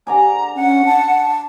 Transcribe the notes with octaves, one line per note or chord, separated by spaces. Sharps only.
D3 D5 G#5 A#5
C#4 F#5
A5